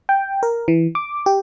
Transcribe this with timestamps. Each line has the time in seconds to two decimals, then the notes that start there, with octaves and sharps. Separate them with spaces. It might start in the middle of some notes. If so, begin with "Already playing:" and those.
0.09 G5
0.43 A#4
0.68 E3
0.95 D6
1.26 G4